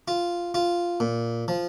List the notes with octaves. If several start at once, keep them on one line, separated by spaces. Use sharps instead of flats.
F4
F4
A#2
F3